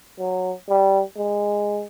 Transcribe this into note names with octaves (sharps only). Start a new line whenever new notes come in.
F#3
G3
G#3